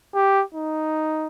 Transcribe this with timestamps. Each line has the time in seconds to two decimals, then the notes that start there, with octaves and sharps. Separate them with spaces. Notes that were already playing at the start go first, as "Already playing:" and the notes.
0.15 G4
0.55 D#4